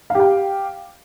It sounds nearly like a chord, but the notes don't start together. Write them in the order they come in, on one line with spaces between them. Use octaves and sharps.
F5 G4 G5